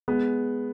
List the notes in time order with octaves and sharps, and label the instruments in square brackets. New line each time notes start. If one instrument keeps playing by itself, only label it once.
[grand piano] G#3 B3